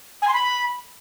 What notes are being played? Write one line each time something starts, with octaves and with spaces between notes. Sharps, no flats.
G#5
C6
B5